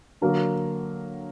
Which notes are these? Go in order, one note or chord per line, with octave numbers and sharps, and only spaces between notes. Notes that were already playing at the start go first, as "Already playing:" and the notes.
D3 F#3 A#3 A#4